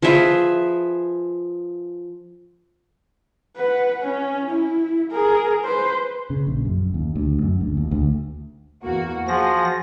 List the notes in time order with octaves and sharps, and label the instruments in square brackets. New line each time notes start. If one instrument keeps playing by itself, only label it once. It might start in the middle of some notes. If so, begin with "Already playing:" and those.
[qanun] F3 G#4 B4 E5
[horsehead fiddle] B4 F#5
C#4
E4
G#4 A#4
B4 C5
[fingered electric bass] C#3
A#1
F#2
D#2
D2
F#2
D2
D#2
D2
[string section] E2 A#3 F#4
[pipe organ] F3 A#6 [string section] F#4 G#4 F#5